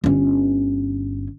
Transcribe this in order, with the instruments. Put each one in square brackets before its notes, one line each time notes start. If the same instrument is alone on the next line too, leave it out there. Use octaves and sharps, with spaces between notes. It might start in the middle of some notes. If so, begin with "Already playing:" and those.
[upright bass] G1 C#4